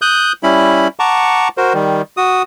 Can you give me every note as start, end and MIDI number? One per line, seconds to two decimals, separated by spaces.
0.02 0.32 87
0.02 0.32 90
0.02 0.32 91
0.43 0.88 55
0.43 0.88 61
0.43 0.88 64
0.43 0.88 83
0.99 1.48 78
0.99 1.48 81
0.99 1.48 82
0.99 1.48 85
0.99 1.48 86
1.57 1.73 66
1.57 1.73 70
1.57 1.73 72
1.74 2.02 51
1.74 2.02 55
2.17 2.43 66
2.17 2.43 87